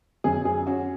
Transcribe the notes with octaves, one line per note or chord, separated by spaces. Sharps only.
F#2 G#4
G#4
C#4 F#4